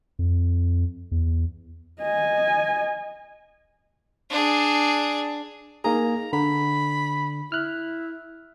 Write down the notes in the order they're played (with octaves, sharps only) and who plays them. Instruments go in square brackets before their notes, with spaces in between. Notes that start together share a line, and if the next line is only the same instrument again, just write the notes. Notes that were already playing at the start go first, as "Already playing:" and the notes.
[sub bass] F2
E2
[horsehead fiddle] D#5 G#5
[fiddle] D4 G#4
[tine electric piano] A#3 D#4 G#4 [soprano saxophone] A#5
[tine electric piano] D3 [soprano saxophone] B5
[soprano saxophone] E4 [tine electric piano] F6 F#6